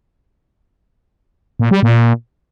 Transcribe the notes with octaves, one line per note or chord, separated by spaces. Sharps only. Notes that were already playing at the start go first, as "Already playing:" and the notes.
A#2
G3
A#2